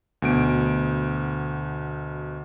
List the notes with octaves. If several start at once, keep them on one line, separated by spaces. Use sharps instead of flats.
D2 B2 D7